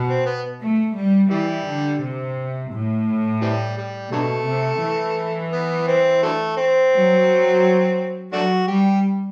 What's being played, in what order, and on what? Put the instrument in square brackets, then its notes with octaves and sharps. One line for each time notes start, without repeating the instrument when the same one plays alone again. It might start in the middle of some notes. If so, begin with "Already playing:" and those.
Already playing: [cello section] B2
[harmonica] C4
B3
[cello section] A3
G3
[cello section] E3 [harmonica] G3
[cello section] D3
C3
A2
[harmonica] C3 E3 G3
G3
[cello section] B2 [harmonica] D3 F#3 A3
[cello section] C3
E3
[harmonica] B3
C4
D3 F#3 A3
C4
[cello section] F#3
[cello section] F#3 [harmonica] A3 D4 F#4
[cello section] G3 [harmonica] G4